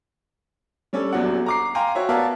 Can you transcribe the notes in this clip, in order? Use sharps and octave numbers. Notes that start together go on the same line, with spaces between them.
G3 C#4 D4 A4
D#1 E2 F#3 D4 F#5
A#5 D6 C7
F5 G5 G#5 A#5 C6
F#4 C#5 E5
B3 A#4 D5 E5 F5 A5